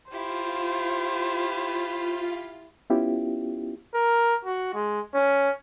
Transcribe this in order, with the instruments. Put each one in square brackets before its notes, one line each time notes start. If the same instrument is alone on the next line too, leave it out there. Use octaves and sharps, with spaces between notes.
[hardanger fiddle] E4 G4 [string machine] F4 [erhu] C5
[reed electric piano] B3 C#4 E4 F4 G4
[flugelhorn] A#4
F#4
G#3
C#4